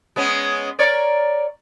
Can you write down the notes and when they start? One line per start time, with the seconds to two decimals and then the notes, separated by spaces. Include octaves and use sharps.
0.16 G#3 B3 C#4
0.79 A#4 C#5 D5